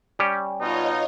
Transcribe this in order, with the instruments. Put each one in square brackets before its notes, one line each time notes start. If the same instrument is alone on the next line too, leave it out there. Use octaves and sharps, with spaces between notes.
[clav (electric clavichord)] G3 C#4 G4
[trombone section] B2 D#4 [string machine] F4 C#5 D#5